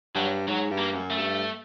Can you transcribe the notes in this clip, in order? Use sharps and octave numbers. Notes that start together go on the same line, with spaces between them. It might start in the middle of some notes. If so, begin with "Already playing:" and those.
G2 F#3
G#2 F#3
G2
A#3
F#2
A3
G2